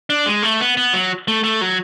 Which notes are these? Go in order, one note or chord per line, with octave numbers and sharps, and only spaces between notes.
D4
G#3
A3
B3
B3
F#3
A3
A3
F#3